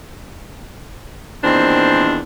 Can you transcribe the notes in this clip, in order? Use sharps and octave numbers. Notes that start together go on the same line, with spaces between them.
E2 A#2 D#3 C4 D4 C5